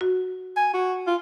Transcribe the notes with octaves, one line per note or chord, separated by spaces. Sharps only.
F#4
G#5
F#4
F4